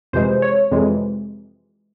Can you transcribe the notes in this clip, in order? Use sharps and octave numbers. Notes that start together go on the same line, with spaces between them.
F2 C3 E3 G#3 C5
C#5
F2 C3 E3 G#3